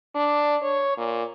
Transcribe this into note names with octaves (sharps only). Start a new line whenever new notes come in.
D4
C#5
A#2